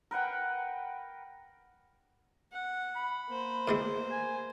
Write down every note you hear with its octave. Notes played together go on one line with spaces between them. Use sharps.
A#4 B4 F#5 G5
F#5
B5
A#3 C5
A2 E3 G#3
G#5